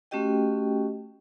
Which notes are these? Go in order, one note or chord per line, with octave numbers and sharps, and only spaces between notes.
A3 C#4 F#4 G4 D#5 G5